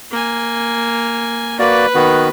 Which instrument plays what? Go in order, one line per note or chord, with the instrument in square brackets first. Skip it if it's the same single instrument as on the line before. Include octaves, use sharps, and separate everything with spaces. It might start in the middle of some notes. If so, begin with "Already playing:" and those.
[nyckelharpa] A#3 G#5
[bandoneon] A#3 F#4 D5 [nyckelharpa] B4
[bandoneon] D#3 B3 F#4